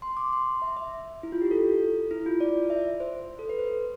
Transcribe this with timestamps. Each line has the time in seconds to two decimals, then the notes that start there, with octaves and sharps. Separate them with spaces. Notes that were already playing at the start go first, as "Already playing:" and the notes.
0.02 C6
0.17 D6
0.33 C6
0.62 E5
0.77 E5
1.23 E4
1.32 F4
1.42 G4
1.51 A4
2.11 E4
2.26 F4
2.40 D5
2.70 E5
3.00 C5
3.39 A4
3.49 B4
3.59 C5